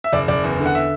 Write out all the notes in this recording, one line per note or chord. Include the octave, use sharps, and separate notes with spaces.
E5
F#1 D5
F#1 D5
E2
D3
F#5
E5